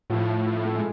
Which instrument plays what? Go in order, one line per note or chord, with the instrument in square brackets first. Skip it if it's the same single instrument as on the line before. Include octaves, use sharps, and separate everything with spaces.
[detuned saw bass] A2 [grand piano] F3
[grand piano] F3
A3
G#3